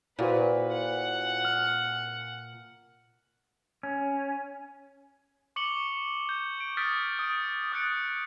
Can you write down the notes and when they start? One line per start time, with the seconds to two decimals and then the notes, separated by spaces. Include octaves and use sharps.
0.19 A#2 E4 F#4 B4 C5
0.72 F#5
1.45 F6
3.83 C#4
5.56 C#6 D6 C#7 F#7 G7
6.29 G6
6.60 D7
6.77 D#6 F6 G6 A6 B6 D7
7.19 D#6 D7
7.72 D#6 F#6 A6 C#7 D7